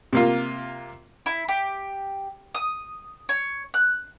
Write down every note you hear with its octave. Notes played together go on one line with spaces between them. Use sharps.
C3 A#3 F4
E4
G4
D#6
C#5
F#6